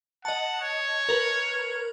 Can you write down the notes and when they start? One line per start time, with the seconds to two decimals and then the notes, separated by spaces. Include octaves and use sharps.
0.25 D#5 F#5 A5
0.62 C#5
1.09 A#4 B4